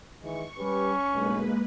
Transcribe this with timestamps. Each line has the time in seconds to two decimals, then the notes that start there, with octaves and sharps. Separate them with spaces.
0.22 D#3 E3 G#3 C#6
0.58 G3 C#4 G4 B4
1.12 B1 G2 B2 G#3 A#3 B4